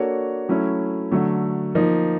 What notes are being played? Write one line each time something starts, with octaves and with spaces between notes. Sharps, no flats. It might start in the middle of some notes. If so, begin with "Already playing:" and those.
Already playing: A#3 D4 F#4 A4 C#5
F#3 A3 C#4 E4
D3 F#3 A3
F3 A#3 D#4